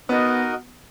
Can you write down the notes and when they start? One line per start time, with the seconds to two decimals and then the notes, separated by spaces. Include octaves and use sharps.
0.09 B3 D#4 F#4 A#4 D#5